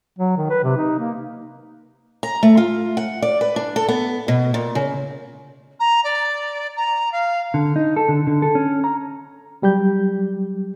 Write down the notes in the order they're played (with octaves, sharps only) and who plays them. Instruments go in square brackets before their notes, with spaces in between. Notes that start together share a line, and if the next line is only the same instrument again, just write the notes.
[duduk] F#3
D#3
B4
C3
D#4
A#3
[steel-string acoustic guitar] A#5
A3
F4
F#5
D5
B4
D4
A4
B3
B2
A#2
C#3
[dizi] A#5
D5
A#5
F5
[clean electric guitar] D3
D#4
A4
D3
D3
A4
C#4
A#5
[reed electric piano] F#3 G3 G4 G6